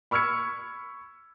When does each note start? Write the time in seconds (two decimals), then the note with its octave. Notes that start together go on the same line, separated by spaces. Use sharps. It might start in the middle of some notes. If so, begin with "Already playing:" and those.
0.11 B5 C#6 E6 F6 G#6 C#7